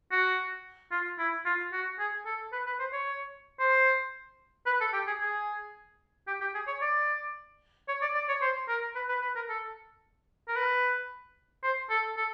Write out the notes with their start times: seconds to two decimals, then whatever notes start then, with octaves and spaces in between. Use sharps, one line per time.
0.12 F#4
0.92 F4
1.19 E4
1.45 F4
1.72 F#4
1.99 G#4
2.26 A4
2.52 B4
2.66 B4
2.79 C5
2.93 C#5
3.59 C5
4.66 B4
4.81 A4
4.93 G4
5.07 G#4
5.21 G#4
6.27 G4
6.41 G4
6.55 G#4
6.67 C#5
6.82 D5
7.88 C#5
8.02 D5
8.15 D5
8.29 C#5
8.42 C5
8.68 A#4
8.95 B4
9.09 B4
9.22 B4
9.35 A#4
9.49 A4
10.48 A#4
10.56 B4
11.63 C5
11.90 A4
12.17 A4